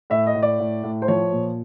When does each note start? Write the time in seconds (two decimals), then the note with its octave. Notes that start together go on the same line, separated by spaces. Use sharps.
0.10 A2 E5
0.27 D#5
0.35 A2
0.43 D5
0.59 A2
0.84 A2
1.02 C5
1.08 F3 C#5
1.32 A#2